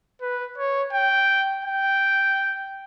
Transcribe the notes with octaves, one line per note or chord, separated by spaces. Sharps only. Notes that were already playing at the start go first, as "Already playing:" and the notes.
B4
C#5
G5
G5